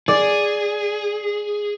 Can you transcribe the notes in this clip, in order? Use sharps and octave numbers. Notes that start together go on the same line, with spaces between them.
G#4 D5